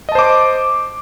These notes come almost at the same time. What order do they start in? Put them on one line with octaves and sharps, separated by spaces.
D#5 A5 C5 D6